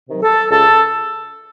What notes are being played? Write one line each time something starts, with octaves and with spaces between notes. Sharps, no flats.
C3 D#3 F#3
A4
C#2 A4